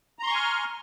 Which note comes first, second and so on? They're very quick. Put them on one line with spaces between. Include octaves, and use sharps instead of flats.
A#5 C6 C#6 G#5 F6